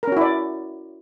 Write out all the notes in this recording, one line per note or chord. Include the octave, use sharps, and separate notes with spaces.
C#4 E4 F#4 A#4 D5